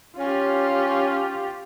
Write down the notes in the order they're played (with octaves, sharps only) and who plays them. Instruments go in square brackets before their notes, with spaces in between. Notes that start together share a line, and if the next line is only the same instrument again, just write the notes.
[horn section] C#4 [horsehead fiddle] F4 G4